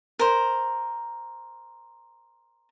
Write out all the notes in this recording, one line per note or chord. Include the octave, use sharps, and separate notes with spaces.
A#4 C5